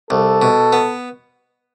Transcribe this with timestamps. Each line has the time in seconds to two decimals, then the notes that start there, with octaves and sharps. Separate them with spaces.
0.10 C2 A4
0.42 B2
0.73 B3